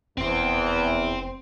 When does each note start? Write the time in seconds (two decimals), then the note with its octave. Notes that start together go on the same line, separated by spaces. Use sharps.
0.18 F1 E2 C4 C5